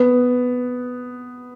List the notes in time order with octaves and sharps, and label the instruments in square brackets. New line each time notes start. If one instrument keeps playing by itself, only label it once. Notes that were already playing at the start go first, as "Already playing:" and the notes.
Already playing: [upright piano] B3